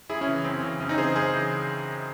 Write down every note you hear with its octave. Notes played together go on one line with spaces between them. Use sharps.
F#2 E4 G#4
C#4 E4
C#3 E3
F#2 C4
C#3 E3
F#2 C#4
C4 D#4
C#3 E3 G#4 C5
F#2 G#4 C5
C#3 E3